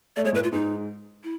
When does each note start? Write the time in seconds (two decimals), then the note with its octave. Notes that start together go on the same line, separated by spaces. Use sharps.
0.16 A3 D5
0.24 G#3 C#5
0.32 A2 A3 B4
0.44 F4
0.52 G#2 G#3 D#4
1.24 E4